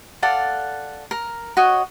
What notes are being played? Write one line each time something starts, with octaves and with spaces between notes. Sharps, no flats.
A4 D5 F5 F#5
A#4
F#4 C#5 D#5